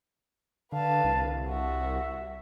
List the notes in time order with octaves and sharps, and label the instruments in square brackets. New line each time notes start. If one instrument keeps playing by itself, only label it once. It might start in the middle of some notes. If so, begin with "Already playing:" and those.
[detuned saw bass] D3 [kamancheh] B4 F5 [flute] A5
[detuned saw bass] C2
[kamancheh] F#4 [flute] E5